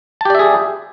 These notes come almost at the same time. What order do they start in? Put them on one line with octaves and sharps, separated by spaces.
A5 G4 D5 E5 G#4